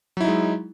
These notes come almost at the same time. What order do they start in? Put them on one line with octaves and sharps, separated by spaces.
F#3 E4 D#4 G#3